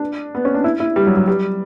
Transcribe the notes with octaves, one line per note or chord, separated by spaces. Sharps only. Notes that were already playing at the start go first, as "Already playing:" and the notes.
Already playing: D4
B3
C#4
D4
E4
E4
G3
F#3
F#3
G3